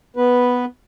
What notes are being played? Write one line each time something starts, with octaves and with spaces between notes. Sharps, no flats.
B3 B4